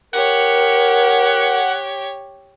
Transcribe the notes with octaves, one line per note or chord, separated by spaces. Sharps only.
G4 A#4 C#5 F#5